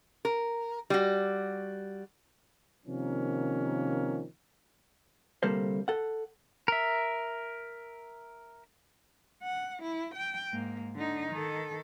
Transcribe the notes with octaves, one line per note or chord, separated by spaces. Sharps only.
A#4
G3 F#4
C3 D#3 F3 A#3 C#4
D2 C3 G3 A#3 A4 C5
A4 F#5
A#4 E5
F#5
E4
G5
G#2 A#3
D3 D#4
D#3 A4